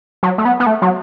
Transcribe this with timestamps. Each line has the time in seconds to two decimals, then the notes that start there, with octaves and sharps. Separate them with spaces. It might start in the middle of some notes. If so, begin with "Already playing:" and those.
0.23 F#3
0.38 A3
0.45 B3
0.60 B3
0.67 A3
0.82 F#3